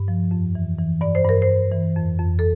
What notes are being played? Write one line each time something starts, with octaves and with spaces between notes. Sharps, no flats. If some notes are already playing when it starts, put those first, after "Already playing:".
Already playing: G2
F3
F2
E3
E3
G2 D5
C5
G2 A#4
C5
G2
E3
F2
F2
A4